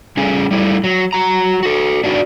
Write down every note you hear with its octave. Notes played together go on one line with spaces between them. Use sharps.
G3 A3 C#4 G#4 G#5
G3 A3 E4
F#3
F#3 F#4 A#5
F#4 A4
D4 D#4 F#4 A#4 D5